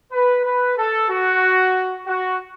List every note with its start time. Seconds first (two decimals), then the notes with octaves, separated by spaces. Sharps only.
0.12 B4
0.45 B4
0.77 A4
1.09 F#4
2.06 F#4